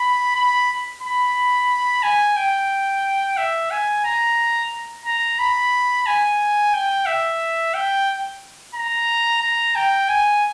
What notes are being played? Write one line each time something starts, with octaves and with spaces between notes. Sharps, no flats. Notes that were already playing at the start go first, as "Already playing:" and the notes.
Already playing: B5
B5
B5
G#5
G5
E5
G#5
A#5
A#5
B5
G#5
G5
E5
G5
A#5
A#5
G5
G#5